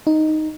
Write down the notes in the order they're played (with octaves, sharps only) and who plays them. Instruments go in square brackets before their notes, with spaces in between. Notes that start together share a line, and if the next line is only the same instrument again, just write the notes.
[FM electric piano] D#4